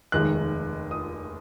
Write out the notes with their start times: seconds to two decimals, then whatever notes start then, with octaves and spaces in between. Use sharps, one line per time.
0.12 F1 D#2 D#3 G#3 F#6
0.91 D#6